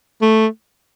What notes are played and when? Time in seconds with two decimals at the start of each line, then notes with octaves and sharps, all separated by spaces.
0.22 A3